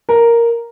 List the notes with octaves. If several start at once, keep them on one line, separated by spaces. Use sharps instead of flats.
A#4